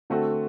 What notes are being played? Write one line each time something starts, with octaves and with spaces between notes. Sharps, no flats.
D3 A3 C4 F#4 A4